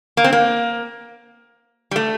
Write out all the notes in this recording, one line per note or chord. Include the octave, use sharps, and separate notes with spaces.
A#3
C4
A#3
G3
A3